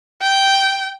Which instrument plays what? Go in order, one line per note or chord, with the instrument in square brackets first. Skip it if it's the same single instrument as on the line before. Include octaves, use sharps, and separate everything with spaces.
[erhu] G5